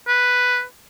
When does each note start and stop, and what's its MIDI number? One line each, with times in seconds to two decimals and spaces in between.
0.07 0.64 71